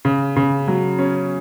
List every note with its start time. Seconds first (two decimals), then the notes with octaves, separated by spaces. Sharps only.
0.05 C#3
0.36 C#3
0.68 F#3
0.99 C#4